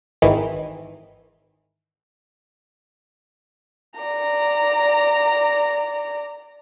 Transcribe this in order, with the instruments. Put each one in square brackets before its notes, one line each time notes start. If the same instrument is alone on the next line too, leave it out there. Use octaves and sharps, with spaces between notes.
[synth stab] G#1 D#3 E3
[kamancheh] D5 A#5